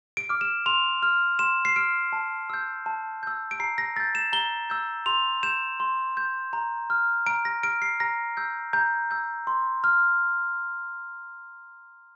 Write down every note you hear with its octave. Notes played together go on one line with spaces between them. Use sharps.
D7
D6 F6
E7
C6 F7
F6
C6 E7
C7
F6 D7
A5
E6 G6
A5
E6 G6
D7
A#5 C7
A#6
E6 G6 A6
E7
A#5 G7
E6 G6
C6 F7
G6 E7
C6
G6
A#5
F6
A#5 D7
A#6
F6 D7
C7
A#5 A#6
E6 G6
A#5 G6
E6 G6
C6
F6